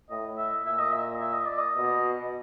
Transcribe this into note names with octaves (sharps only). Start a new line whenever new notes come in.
A2 D#5
E5
A#2 E5
D#5
E5
E5
D#5
D5
D#5
B2